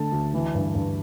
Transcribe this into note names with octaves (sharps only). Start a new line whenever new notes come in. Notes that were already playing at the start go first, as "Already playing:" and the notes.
Already playing: D3 A3 A5
D2
E3
G2
G2